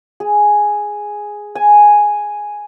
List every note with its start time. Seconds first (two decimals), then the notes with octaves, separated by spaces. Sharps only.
0.20 G#4
1.55 G#5